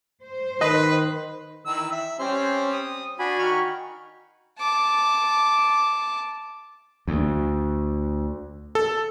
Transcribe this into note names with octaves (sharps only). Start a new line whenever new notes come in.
C5
D#3 B4 D#5
D#3 E3 E6
E5
G3 C4 C#4 C5
D#6
D4 F#4 G#5 B5
D#3 C#6 F6
A5 D6
D2
A4